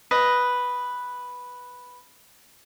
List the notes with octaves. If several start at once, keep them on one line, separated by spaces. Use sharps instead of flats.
B4 D#5